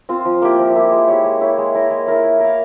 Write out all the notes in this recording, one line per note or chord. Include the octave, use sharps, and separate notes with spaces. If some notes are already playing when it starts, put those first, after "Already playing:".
C4 F4 C5
F3
A#3 E4 G4
F3
A#3 E4 G4
G#3
E4 G4 C#5
G#3
E4 G4 C#5
G#3
E4 A#4 C#5
G#3
E4 A#4 C#5
E4
A#4 F5